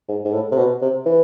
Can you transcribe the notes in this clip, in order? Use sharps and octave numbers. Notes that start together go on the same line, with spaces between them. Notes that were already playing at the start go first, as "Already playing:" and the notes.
G#2
G#2
A2
C3
B2
C3
E3